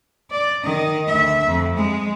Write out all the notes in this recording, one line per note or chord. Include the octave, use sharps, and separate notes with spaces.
D5
D#3 D#5
D2 E5
F2
G#3